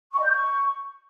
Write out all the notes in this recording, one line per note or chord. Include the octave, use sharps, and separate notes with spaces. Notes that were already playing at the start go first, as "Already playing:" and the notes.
C#6
D#5
G6
C#6